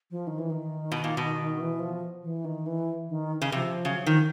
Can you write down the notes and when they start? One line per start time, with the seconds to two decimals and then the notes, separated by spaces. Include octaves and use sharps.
0.10 F3
0.27 D#3
0.38 E3
0.50 D#3
0.92 B2
1.04 A#2
1.17 B2
1.57 E3
1.79 F3
2.22 E3
2.44 D#3
2.66 E3
3.09 D#3
3.42 C#3
3.52 C3 F3
3.85 C#3 F#3
4.06 D#3 F3